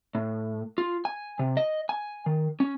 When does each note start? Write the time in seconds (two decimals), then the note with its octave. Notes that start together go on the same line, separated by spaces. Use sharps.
0.15 A2
0.78 F4
1.05 G#5
1.39 C3
1.57 D#5
1.89 G#5
2.26 D#3
2.60 C#4